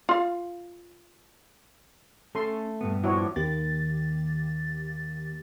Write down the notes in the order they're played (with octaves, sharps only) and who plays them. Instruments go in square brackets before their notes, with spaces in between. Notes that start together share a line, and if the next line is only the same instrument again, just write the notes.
[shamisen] F4 F5
[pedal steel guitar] A3 [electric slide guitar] C#4 [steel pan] A4 C6
[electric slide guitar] G2 A#2 B3
[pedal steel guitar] F3 D4 [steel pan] E4 F#4 C#5
[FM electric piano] D#2 D#3 A#3 G4 A6